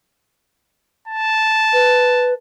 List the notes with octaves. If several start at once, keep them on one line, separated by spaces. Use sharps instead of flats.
A5
B4